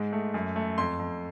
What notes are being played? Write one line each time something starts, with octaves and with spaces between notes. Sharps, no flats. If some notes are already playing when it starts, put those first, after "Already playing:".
Already playing: G#2 G#3
A3
F#2
A3
F2 C6
F2